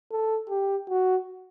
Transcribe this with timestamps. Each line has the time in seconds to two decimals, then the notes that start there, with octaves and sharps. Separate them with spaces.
0.11 A4
0.50 G4
0.89 F#4